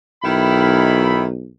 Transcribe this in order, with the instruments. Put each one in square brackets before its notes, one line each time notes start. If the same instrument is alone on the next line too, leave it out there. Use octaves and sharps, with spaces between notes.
[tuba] B1 [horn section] D#3 E4 B5